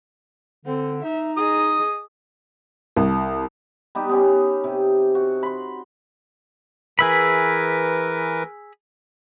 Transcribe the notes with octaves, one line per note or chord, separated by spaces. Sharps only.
D3 C4
D#4 E5
G#4 D#5 D#6
C2
G3 B3 D#4 G4
B3 C#4
C3
F#4
B5 C6
E3 G#4 A#4 B4 E5 B5